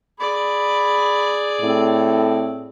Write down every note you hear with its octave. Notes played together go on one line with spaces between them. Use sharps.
G#4 D5 B5
A2 C4